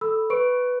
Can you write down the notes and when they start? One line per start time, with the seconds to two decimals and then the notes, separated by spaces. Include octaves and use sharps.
0.01 A4 B5 E6
0.30 B4 C#6 D7